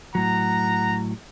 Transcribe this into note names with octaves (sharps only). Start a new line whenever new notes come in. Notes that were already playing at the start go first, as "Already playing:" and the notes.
A2 F#3 F#5 A#5